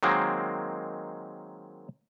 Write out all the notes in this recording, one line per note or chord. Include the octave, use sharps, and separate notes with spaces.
D#3 F#3 G#3 A#3 C4